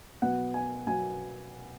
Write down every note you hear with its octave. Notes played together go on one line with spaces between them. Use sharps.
B2 F#3 B3 F#5
G#5
B2 F#3 B3 G#5